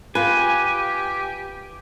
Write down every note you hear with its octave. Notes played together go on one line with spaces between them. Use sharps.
F4 G4 B4 G#5